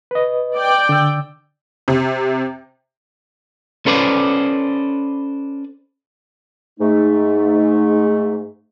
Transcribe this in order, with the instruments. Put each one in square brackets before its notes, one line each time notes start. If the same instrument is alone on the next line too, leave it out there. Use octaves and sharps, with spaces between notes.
[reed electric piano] B4 D#5
[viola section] D5 G5
[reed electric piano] D3 E6
[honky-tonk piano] C3
[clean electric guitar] C#4 A4 B4 C5 D5
[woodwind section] G#2 A3 [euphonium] D#4